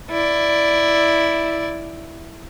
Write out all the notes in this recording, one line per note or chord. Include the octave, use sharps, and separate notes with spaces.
E4 D5